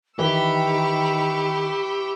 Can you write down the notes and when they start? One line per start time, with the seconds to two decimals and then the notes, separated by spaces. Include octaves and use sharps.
0.19 D#3 E3 G4 B5 C#6 E6